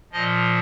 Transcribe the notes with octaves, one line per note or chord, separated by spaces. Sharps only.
A#2 F3 D#5